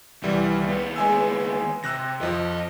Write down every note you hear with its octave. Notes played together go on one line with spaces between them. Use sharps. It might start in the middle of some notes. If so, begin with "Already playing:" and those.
C2 E3 G3
D#2 B3
G#3 G#5 E6
C3 E6 F#6 A#6
F2 F3 D#5